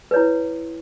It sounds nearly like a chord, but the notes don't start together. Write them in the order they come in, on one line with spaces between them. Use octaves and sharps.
B4 C#5 E4